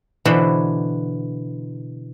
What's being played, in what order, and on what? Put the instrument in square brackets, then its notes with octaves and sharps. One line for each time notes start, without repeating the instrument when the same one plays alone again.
[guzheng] B2 D3 E3 C5 B5